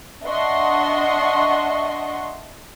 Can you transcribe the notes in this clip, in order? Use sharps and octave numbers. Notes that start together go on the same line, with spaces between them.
D4 D#5 E5 F#5 C6 C#6